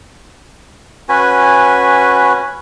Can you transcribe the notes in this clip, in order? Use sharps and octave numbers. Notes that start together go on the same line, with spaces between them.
C#4 F#4 B4 G#5